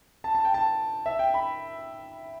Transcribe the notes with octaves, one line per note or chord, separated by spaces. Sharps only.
A5
A5
G5
A5
E5
G5
B5